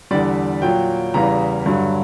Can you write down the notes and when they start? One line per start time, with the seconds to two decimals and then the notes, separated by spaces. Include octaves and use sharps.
0.11 E2 D3 G3 D5
0.62 A#2 F#3 G5
1.14 E2 C#3 E3 G3 A#5
1.66 G2 D3 F#3